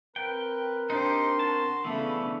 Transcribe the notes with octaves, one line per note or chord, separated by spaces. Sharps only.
C4 A#4 B4 G5
D4 D#4 G4 C5 C6
F#4 A5
C#3 E3 A3 B3 D4 E5